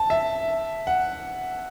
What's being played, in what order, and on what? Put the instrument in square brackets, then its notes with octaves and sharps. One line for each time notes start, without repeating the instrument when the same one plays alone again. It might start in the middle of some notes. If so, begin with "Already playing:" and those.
Already playing: [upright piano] A5
E5
F#5